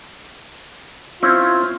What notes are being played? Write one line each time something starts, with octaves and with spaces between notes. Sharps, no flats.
C4 C#4 E4 F4